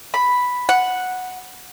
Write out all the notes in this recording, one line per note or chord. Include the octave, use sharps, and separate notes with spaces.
B5
F#5